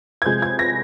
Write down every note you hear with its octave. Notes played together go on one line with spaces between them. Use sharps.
G#6
C3 F3 G#3 G6
G#6
A#6